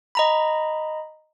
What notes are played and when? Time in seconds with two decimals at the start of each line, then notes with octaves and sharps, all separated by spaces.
0.15 D#5 A#5 B5